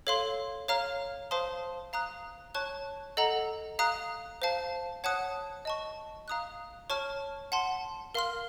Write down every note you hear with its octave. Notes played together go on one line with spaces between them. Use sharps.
A4 C#5 F5 C6
C#5 F5 A#5 F6
C5 F5 A5 C6 D#6
F5 A#5 D#6 F#6
C#5 A5 C#6 F#6
A4 D#5 F#5 A#5
F5 A#5 D#6 F#6
C5 F5 A5
C#5 F#5 A5 D#6 F#6
D#5 A5 C#6
F5 A#5 D#6 F#6
C#5 A5 C#6 F6
F#5 A5 C6
A#4 F5 C6 F6